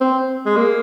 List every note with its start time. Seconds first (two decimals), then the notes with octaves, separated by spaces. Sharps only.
0.01 C4
0.46 G#3
0.57 A#3